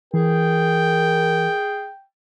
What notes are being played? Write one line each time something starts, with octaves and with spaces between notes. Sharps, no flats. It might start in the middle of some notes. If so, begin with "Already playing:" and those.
E3 G#4 A#4 G5